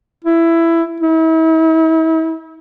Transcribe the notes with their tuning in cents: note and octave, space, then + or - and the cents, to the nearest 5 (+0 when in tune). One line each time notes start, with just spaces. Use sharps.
E4 +15
E4 -40